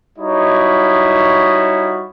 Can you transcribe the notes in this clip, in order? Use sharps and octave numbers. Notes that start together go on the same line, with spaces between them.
G3 D#4 E4 F#4 C#5 D#5